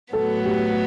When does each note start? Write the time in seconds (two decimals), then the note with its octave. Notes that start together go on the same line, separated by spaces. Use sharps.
0.13 A2 F#3 B3 A4
0.45 G4